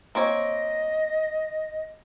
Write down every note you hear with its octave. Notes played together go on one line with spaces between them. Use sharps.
A#3 C4 C#5 D#5